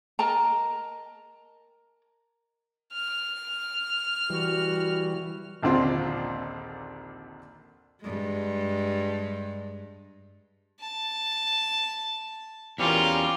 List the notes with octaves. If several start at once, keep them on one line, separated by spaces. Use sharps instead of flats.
A#4 D#5 A5 A#5
F6
E3 G3 F#4
A#1 D#2 D3 C4 F4
G2 G#3
A5
E2 G3 C#4 F4 A#4